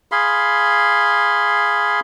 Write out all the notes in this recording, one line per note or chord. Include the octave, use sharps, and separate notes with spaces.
G#4 F5 B5 C6